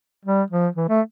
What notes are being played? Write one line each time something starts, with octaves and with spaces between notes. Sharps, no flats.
G3
F3
E3
A3